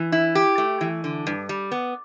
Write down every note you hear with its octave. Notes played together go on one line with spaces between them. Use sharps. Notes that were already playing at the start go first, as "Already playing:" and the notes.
Already playing: E3
E4
G4
A3
E3
D3
G2
G3
B3